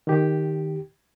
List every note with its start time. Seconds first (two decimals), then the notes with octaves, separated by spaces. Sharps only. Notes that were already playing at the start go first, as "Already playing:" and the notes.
0.07 D#3 G4